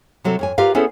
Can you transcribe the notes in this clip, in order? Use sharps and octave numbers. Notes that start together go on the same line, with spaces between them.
C3 F#3 C4 A4
F2 C#5 G#5
F4 G4 A#4 B4 F5
B3 C#4 E4 G#4 A4 C5